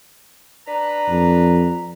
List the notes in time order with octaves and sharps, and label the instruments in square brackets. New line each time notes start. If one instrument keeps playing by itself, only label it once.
[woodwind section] D4 B4 A#5
[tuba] F2